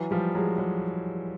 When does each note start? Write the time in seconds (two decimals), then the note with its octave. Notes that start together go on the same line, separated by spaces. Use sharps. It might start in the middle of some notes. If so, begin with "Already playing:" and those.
Already playing: E3 F#3
0.11 F3 G3
0.35 F#3 G#3
0.58 F#3 G#3